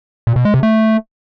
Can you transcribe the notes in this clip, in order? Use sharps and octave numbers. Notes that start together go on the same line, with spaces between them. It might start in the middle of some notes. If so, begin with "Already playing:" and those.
A#2
B2
G#3
C3
A3